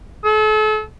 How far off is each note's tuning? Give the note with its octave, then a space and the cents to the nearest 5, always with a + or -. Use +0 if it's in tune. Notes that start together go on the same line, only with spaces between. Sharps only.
A4 -40